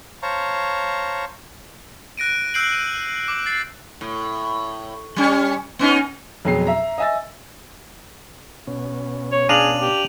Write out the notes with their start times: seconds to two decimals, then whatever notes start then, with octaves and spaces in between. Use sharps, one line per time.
0.23 C5 C#5 F5 A5 A#5 C#6
2.18 F#6 A#6 D7 D#7
2.54 E6 F#6 G6 C7 D7 F#7
2.72 D#7
3.28 D6
3.46 A6 C7
4.01 A2
5.16 G3 C#4
5.79 B3 C#4 D#4
6.45 F2 B2 F#3 G#3 C7
6.67 E5 A#5
6.98 D#5 E5 G#5 E6 A6
8.67 B2 C#4
9.32 C#5
9.49 D4 G#4 F5 A#5 D#7 F7 F#7
9.81 G4